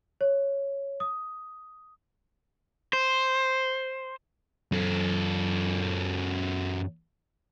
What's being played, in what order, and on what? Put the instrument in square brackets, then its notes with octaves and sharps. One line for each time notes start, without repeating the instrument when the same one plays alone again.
[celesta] C#5
D#6
[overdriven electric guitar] C5
[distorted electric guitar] F#2 A4